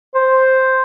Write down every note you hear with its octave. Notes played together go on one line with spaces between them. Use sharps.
C5